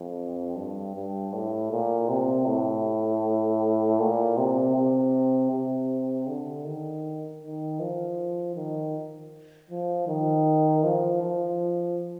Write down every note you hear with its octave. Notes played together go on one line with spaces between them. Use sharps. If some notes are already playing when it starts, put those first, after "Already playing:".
Already playing: F2
G2
G2
A2
A#2
C3
A2
A#2
C3
C3
C3
D3
D#3
D#3
F3
D#3
F3
D#3
F3
F3